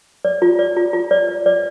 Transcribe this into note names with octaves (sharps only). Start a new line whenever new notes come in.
D5
F4
D5
F4
F4
D5
D5
D5